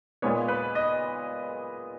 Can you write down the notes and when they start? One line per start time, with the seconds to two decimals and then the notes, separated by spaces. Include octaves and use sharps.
0.22 A#2 G#3 B3 C#5
0.48 B4
0.75 D#5